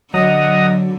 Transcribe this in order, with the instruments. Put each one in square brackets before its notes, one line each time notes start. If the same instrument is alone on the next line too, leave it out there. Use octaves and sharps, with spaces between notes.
[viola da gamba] D3 [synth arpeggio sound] F#3 [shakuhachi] D#5 [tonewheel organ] F#5 A#5 D#6